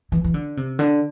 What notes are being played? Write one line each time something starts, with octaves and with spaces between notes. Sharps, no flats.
E3
E3
D3
C3
D3